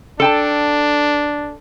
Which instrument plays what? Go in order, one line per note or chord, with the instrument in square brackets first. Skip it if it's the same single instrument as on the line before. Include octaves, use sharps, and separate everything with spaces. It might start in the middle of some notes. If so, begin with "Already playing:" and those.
[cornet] D4 [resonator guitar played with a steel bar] A4 G5 A5